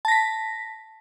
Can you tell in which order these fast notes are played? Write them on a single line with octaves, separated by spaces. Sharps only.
A5 A#6 B6